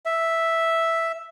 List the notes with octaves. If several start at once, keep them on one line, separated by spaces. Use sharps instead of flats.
E5